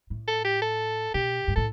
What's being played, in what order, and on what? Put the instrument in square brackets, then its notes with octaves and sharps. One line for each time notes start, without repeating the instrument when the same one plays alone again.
[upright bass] A2
[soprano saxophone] A4
G4
A4
[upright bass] B2 [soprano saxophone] G4
[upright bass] G2
[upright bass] A2 [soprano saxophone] A4